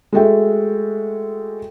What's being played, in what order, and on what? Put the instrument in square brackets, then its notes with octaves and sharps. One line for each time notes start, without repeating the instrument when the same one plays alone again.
[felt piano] G#3 A3 F#4 A4 E5 G5